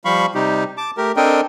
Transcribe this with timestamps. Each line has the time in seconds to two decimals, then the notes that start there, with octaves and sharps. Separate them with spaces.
0.05 F3 G3 F5 B5 C#6
0.35 C3 G3 D#4 G4
0.77 A5 D6
0.97 A3 G4 A#4
1.17 C4 D4 A4 A#4 D#5 G5